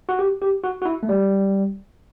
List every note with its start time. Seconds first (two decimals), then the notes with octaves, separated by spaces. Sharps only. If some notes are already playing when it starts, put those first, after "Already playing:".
0.09 F#4
0.19 G4
0.42 G4
0.63 F#4
0.82 F#4
0.85 E4
1.03 A3
1.09 G3